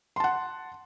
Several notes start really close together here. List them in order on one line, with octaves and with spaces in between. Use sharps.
C6 A5 F#5